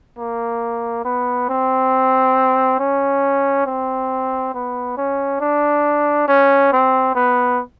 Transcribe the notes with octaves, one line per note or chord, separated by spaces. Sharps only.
A#3
B3
C4
C#4
C4
B3
C#4
D4
C#4
C4
B3